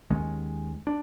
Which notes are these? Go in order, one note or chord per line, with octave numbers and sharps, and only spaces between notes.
D#2 D#3 G#3 C#4
D4